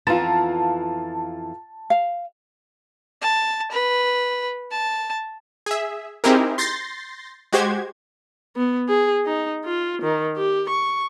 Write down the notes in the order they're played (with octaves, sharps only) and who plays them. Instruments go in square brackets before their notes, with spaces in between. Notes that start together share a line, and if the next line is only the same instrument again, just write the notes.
[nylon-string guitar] F2 E3 B3 [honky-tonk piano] F4 A#5 [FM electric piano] A5
[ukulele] F5
[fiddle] A5
B4
A5
[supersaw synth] G#4 E5
C4 D#4 E4 G4 G#4 A#4
C6 G6 A6 A#6 C7
G#3 F#4 G4 C5 G#6
[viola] B3
G#4
D#4
F4
D#3
G4
C#6